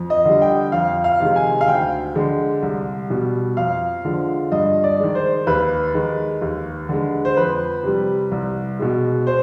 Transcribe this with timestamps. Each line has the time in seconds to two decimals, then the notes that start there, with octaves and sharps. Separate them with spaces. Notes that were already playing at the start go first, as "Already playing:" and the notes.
Already playing: F2
0.10 D#5
0.25 D3 G3
0.42 G5
0.72 F2 F5
1.04 F5
1.20 C3 D#3 G#3
1.36 G#5
1.61 F5
1.68 D2 G5
2.15 D3 G#3
2.62 C2
3.10 B2 G3
3.57 F2 F5
4.05 D3 F3 G#3
4.52 G2 D#5
4.84 D5
5.00 D#3 G#3
5.15 C5
5.47 D#2 B4
5.94 D#3 G#3
6.42 D#2
6.89 D3 G#3
7.25 C5
7.37 F2 B4
7.83 C3 G3
8.31 C2
8.79 B2 G#3
9.27 C5